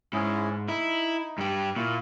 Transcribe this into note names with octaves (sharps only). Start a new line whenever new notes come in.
G#2 C#4 E4 G#4
D#4 E4
G2 G4
A#2 E4 F5 C#6